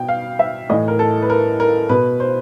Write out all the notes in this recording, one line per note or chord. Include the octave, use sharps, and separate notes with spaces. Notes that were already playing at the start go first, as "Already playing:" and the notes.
Already playing: B2 G5
F5
E5
A2 E3 D#5
A#4
A4
B4
A#4
A#4
B2 B4
C5